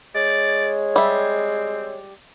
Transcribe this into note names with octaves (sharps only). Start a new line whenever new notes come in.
G#3 C#5 D5
G3 C4 E5